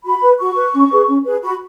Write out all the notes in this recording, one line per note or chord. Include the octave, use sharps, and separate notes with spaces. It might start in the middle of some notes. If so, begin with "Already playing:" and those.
F#4 B5
B4
F#4 C#6
B4
C#4
G#4 B4
C#4
G#4 B4
F#4 B5